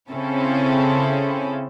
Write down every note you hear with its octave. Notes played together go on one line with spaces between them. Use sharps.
C#3 C4 C#4 E4 A4